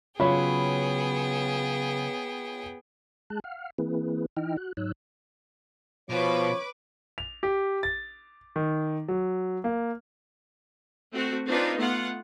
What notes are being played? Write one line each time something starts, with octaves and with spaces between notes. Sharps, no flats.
C#3 F#3 B3 F4 G#4 C#5 G5 B5
G#3 G#4 A5 F#6
F5 F#5 F6
E3 A#3 C4 E4 G#4 B4
E3 D#4 E4 D#5 G5 F6
F#4 F#6
G#2 F#3 D#4 C#5 E6 F#6
B2 F3 B4 C#5 D6
F7
G4
A6
D#3
F#3
A#3
A3 C4 F#4
C4 D4 D#4 F4 B4
A3 B3 F4 F#5